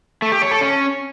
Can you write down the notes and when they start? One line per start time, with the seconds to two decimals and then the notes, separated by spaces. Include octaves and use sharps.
0.22 A3
0.32 G4
0.42 C#5
0.51 A4
0.61 C#4